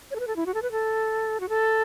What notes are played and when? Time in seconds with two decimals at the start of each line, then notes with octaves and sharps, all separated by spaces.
0.11 C#5
0.16 A4
0.20 B4
0.28 A4
0.36 E4
0.46 F#4
0.54 A4
0.62 B4
0.72 A4
1.40 F#4
1.49 A4